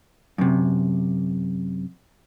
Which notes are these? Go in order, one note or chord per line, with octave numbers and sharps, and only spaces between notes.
F#2 C3